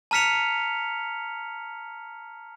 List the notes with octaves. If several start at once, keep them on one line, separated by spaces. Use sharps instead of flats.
A5 A#5 F6 B6 C#7 F7